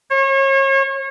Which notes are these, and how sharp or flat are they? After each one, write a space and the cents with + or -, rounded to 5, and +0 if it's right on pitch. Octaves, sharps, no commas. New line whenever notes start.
C#5 -35